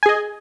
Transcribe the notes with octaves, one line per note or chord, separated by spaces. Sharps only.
G#4 D#5 G#5